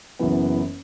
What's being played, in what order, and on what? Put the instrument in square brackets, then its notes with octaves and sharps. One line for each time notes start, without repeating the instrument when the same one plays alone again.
[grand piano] F#1 F#2 E3 B3